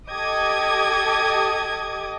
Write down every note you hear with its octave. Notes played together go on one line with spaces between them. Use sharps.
G4 A4 D#5 D6 D#6 G#6